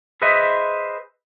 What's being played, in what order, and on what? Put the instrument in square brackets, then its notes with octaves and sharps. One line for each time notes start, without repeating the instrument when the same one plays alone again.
[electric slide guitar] G#4 B4 C5 D#5 E5